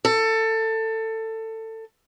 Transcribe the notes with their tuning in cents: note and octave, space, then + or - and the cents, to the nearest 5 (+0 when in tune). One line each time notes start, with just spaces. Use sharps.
A4 +20